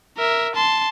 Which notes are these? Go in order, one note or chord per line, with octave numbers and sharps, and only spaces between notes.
A#4 E5
A5 C6